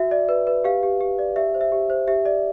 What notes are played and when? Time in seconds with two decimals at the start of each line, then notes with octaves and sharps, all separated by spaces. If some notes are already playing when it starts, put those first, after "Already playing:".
Already playing: F#4 E5
0.11 D5
0.29 B4
0.47 B4
0.64 G4 F5
0.83 G4
1.01 G4
1.18 D5
1.36 G4 E5
1.54 C5
1.61 E5
1.72 G4
1.90 C5
2.07 G4 E5
2.25 D5